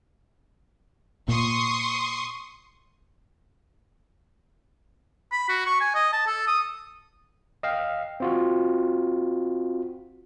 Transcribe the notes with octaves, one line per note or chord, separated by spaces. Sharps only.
A#2 C6 C#6 D#6
B5
F#4
C#6
G#5
D#5
A5
A4
D#6
D#5 F5 G5
C4 F4 F#4